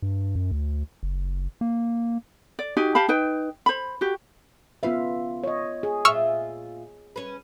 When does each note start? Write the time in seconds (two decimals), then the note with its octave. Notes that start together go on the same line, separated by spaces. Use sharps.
0.02 G2
0.36 F#2
0.51 D2
1.03 F#1
1.61 A#3
2.59 D5
2.77 D#4 F#4 G4 G#5
2.95 G4 F5 A5 B5
3.09 D#4 B4 G5
3.66 C5 B5
4.01 F#4 G4
4.83 C#3 B3 F4 B4 E5 F5
5.44 C#5 D#5
5.83 G#4
6.05 A#2 F4 E5 C#6 E6 F6
7.16 C#4 B4